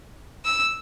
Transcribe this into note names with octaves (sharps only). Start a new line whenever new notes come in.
E6